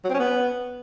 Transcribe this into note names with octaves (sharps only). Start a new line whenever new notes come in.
F#3
C4
C#4
B3